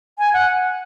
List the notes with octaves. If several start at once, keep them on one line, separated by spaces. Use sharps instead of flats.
G#5
F#5